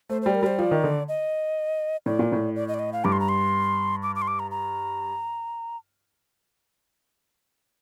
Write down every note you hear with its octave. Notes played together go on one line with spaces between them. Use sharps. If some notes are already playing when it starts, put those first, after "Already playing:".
A3 C5
G3 C5
A#4
G3 C5
F3 D5
D#3
D3
D#5
A2 D5
A#2
A2
D5
D#5
D5
D#5
F5
G2 D6
C6
A#5
C6
D6
D6
C6
D6
A#5
A#5